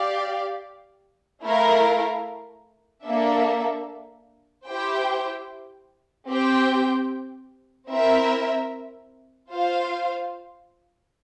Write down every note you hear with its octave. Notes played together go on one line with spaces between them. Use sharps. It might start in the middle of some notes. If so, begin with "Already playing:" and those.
Already playing: G4 D5 F5
A3 E4 A#4 F5
A#3 D4 A4 E5
E4 G4 C5 G5
C4 G4 C5 G5
C4 E4 A#4 E5
F4 C5 F5